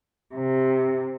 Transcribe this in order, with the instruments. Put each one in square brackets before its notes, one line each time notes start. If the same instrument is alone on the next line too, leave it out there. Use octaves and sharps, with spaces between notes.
[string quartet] C3